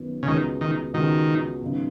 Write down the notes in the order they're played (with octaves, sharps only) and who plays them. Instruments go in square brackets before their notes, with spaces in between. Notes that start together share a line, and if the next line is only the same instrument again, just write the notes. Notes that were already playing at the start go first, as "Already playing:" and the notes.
Already playing: [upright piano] F#2 D#3 B3
[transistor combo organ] C#3
[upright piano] C#2 B2 G#3 B3 F#4 [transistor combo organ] D#3
[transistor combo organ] D#3
[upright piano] C#2 B2 G#3 B3 F#4 [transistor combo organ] D#3
[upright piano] G#1 F#2 C#3 B3 D#4